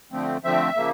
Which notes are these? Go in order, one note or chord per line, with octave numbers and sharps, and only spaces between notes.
D3 F3 A3 C4
D3 F3 A3 C4 E5
C#3 F3 A#3